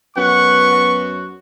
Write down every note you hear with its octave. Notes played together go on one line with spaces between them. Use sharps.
F#2 B3 F#5 C#6
F#4